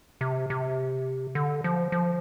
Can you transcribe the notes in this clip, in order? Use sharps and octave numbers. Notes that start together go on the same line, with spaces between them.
C3
C3
D3
F3
F3